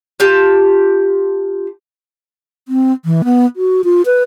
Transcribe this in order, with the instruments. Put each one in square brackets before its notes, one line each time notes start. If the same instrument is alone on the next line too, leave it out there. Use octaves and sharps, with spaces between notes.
[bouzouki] F4 G4 A5
[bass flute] C4
E3
B3
F#4
F4
B4